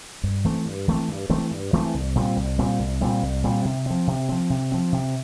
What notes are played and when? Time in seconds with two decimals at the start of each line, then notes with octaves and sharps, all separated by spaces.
0.23 G2
0.44 E3 A3 C4
0.66 G2
0.88 E3 A3 C4
1.09 G2
1.30 E3 A3 C4
1.51 G2
1.73 E3 A3 C4
1.94 C2
2.16 A#2 G3 C4
2.36 C2
2.58 A#2 G3 C4
2.79 C2
3.01 A#2 G3 C4
3.23 C2
3.44 A#2 G3 C4
3.65 C3
3.86 F3 C4
4.07 C3
4.29 F3 C4
4.50 C3
4.72 F3 C4
4.92 C3